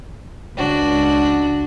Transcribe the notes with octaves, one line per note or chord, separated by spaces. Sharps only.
C#2 D4 F#4